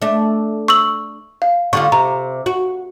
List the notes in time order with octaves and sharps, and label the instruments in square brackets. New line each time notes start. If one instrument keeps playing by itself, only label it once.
[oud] A3 D4
[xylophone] C#6 E6 F#7
F5
[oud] D3 G3 F4 [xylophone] C#6
[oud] C3 [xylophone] A#5
[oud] F#4